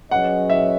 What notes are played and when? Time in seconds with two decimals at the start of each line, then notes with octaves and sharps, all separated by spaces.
0.11 F#3 C#4 G#4 B4 D#5 F#5
0.50 E5